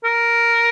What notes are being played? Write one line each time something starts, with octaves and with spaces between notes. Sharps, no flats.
A#4